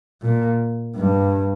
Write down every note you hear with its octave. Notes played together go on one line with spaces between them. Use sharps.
A#2
G2